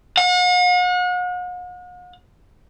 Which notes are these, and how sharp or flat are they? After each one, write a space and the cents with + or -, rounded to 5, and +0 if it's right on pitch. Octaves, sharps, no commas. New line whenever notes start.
F#5 -45